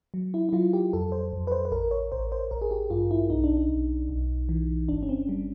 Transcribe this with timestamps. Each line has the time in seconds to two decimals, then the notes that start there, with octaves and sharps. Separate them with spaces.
0.14 F#3
0.34 E4
0.49 E4
0.53 F#3 F4
0.73 G4
0.93 F2 A4
1.12 C5
1.33 F2
1.47 B4
1.52 C5
1.65 B4
1.72 A1 A#4
1.91 C#5
2.12 A1 C5
2.32 C5
2.51 A1 A#4
2.61 G#4
2.71 G4
2.90 G2 F4
3.11 E4
3.30 B1 D#4
3.44 D4
3.57 D#4
3.69 B1
4.09 B1
4.49 E3
4.89 G1 D4
5.03 C#4
5.09 C4
5.29 G3